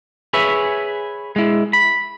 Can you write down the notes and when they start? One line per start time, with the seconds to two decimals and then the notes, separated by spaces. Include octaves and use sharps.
0.33 G#4 B4 C#5 E5
1.36 G#3 E4
1.73 B5